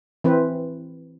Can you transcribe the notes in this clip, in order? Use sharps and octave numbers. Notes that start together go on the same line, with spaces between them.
E3 C4 B4